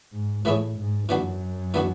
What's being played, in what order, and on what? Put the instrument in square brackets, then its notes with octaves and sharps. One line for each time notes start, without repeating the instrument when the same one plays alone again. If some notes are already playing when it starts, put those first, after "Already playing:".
[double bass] G#2
[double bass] A2 [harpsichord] E3 A3 E4 G#4 C#5
[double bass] G#2
[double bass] F#2 [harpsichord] E3 B3 D4 F#4
[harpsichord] E3 B3 D4 F#4